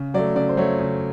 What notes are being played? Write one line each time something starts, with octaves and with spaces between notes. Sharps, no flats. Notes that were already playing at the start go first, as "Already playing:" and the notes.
Already playing: C#3
F#3 A3 D5
C#3 D5
C5
F#3 A3 C#5
C#3